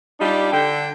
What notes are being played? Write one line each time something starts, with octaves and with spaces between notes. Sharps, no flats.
G3 D4 D#4 F4 G4
D3 G5